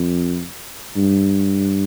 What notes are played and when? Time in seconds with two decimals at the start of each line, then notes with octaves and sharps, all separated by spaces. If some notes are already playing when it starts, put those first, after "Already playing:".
Already playing: F2
0.97 G2